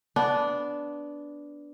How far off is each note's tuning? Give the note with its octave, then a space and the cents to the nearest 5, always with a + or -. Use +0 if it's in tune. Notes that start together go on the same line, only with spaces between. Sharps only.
B3 +0 D4 -10